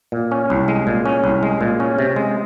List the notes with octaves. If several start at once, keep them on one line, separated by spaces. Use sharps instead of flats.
A#2
C#4
C2
G#3
A#2
C#4
C2
G#3
A#2
C#4
C3
G#3